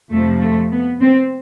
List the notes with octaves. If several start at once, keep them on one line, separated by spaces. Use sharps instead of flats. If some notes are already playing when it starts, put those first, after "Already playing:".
F2 C3 F3 A3
A3
B3
C4